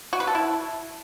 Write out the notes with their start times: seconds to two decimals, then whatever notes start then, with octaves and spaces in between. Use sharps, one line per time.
0.13 F#4
0.20 B4
0.27 A4
0.35 E4